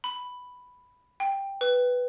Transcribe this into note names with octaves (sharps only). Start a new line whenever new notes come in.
B5
G5
B4